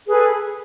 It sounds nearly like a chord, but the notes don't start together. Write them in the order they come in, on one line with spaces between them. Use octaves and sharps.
G#4 B4 A4 G#5